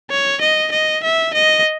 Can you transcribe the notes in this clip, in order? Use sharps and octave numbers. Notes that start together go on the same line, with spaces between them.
C#5
D#5
D#5
E5
D#5